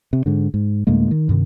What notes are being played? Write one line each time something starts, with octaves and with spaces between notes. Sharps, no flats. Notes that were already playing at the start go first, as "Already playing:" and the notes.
C3
G#2 D3
G#2
D2 A2 G#3 A#3
D#3
G2 C3 D#3